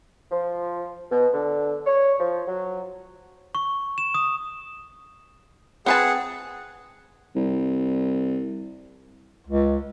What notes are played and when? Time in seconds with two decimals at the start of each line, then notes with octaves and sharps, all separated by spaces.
0.32 F3
1.11 B2
1.33 D3
1.86 C#5
2.20 F3
2.48 F#3
3.55 C#6
3.98 E7
4.14 D#6
5.86 C4 G#4 B4 F#5 A5
7.35 C2
9.47 C#2